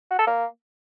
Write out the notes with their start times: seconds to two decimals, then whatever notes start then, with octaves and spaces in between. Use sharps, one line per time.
0.10 F#4
0.19 A4
0.27 A#3